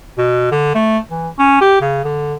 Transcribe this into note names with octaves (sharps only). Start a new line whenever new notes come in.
B2
D3
A3
E3
C#4
G4
C#3
D3